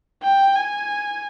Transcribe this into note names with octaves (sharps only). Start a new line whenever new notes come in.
G5
G#5